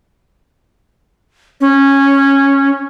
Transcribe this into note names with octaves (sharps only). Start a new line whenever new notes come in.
C#4